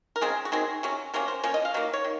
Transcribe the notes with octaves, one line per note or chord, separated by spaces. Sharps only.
A#4
C#3 G#3 C4 G#4
F#4
D#3 F#3 C4 G#4
C3 F#3 C#4
C3 F#3 A#3 C#4 A#4
C5
F3 A#3 C#4 C#5
D#5
F5
D#3 F#3 A#3
C#5
D#3